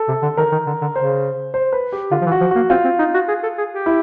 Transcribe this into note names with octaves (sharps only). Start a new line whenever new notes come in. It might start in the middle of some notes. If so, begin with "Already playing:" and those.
Already playing: A4
C3
D3
D#3 A#4
D#3
D3
D3
C#3 C5
C5
B4
G4
D3 F4
F3
E3
F#4
F3
A#3 F#4
C4 F4
C4
D#4
F#4
G#4
A4
G#4
G4
E4